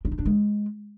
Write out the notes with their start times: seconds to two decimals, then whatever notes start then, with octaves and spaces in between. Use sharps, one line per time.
0.05 D4
0.12 D#4
0.19 D4
0.26 G#3